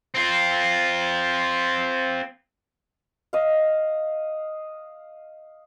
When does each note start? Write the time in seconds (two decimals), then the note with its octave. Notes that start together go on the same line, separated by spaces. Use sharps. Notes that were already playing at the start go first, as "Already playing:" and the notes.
0.15 C4 F4
3.33 D#5 F5